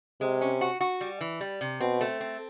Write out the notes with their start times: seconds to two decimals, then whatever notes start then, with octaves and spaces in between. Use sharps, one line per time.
0.21 C3 G#3
0.41 C#4
0.61 F#4
0.81 F#4
1.01 G3
1.21 E3
1.41 G3
1.61 C3
1.81 B2 C4
2.01 A3
2.21 C4